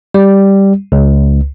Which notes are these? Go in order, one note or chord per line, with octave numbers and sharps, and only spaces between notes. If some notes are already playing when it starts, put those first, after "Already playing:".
G3
C#2